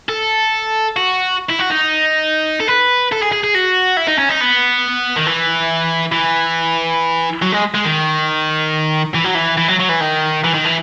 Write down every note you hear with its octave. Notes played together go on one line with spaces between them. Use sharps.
A4
F#4
E4
F#4
D#4
A4
B4
A4
G#4
G#4
G#4
F#4
E4
D#4
C#4
D#4
B3
D#3
E3
E3
F#3
G#3
G#3
D#3
E3
F#3
E3
E3
F#3
F#3
E3
D#3
E3
D#3
E3